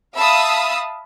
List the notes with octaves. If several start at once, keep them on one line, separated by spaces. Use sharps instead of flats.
E5 F5 A5 B5 D#6 E6